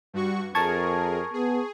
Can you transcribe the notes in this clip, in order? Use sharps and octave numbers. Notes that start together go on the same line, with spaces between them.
G2 F#4 C#6
F2 G#4 A#4 A5 C#6 G#6
B3 G#4